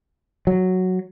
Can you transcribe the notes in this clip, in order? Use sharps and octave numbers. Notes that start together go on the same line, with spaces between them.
F#3